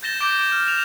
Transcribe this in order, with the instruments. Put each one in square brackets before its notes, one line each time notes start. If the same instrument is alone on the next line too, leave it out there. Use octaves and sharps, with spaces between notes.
[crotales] G6 A6 A#6 E7 G7
D6 G6 A#6 D7 E7 G7
F6
E7 F7